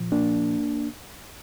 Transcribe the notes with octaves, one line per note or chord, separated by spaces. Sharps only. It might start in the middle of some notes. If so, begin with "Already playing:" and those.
Already playing: A#2 F3
A#3 D4